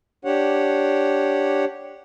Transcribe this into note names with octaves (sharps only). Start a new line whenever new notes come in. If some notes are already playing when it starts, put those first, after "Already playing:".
D4 G4 C#5 F#5